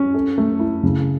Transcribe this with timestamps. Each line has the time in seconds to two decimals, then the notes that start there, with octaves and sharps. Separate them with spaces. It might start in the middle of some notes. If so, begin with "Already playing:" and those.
Already playing: C#4
0.14 A4
0.38 A3
0.60 E4
0.83 C#3